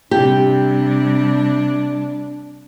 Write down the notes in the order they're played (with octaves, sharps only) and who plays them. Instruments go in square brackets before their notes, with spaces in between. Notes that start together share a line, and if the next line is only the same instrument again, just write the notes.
[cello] C3 G3 [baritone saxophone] D4 [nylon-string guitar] G4